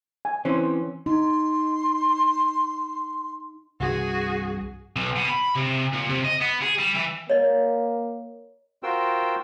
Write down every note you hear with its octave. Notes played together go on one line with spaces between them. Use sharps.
G#5
E3 C4 C#4 C5
D#4 C6
C2 G2 E3 F#4 G#4
B1
B2
B5
C3
A#2
C3
D#5
B3
G#4
G3
E3
A#3 C#5 D#5
F4 F#4 A#4 C5 G5 E6